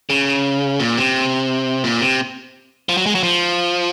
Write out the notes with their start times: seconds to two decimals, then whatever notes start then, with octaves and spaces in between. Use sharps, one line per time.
0.10 C#3
0.80 A#2
0.98 C3
1.84 A#2
2.01 C3
2.89 F3
2.97 F#3
3.06 G#3
3.15 F#3
3.23 F3